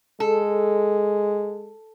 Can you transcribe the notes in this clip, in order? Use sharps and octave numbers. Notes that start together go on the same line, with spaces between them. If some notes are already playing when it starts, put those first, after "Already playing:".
G#3 A4